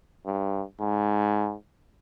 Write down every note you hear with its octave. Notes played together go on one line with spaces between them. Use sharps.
G2
G#2